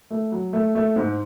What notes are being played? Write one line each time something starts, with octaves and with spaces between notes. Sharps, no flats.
A3
F#3
A3
A3
G#2